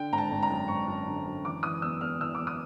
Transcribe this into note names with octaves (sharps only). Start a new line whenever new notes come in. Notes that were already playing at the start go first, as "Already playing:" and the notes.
Already playing: D3 G5
G#1 A#5
A5
G#1
A#5
F#2
G#1 C#6
F#2
D3
F#2
E3 D6
E3 D#6
E2 E6
E2 F6
E3 E6
E2 D6
D#6